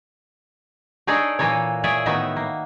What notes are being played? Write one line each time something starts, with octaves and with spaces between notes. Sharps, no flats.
D4 D#4 G#4 A4 C#5 D5
A#2 E3 A#3 A4 C#5
G#4 C#5 D5 E5
A2 D#3 B3 F#4 E5
A#3